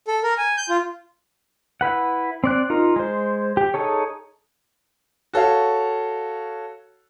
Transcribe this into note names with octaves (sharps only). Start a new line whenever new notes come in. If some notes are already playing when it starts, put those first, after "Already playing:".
A4
A#4
G#5
G6
F4
E4 B4 F#5
C4 D5 F#6
D#4 F4 A#4
G#3 C5
G4
D#4 G#4 A4 C#5
F#4 A4 C#5 F5